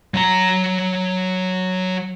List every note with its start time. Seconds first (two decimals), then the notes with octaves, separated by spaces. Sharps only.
0.14 F#3 A#5